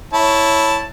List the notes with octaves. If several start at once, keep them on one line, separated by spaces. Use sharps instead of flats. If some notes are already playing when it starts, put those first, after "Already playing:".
E4 C#5 A5